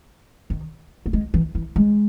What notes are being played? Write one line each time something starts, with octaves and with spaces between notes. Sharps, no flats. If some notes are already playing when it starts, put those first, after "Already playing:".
D#3
A#3
G#3
E3
E3
G#3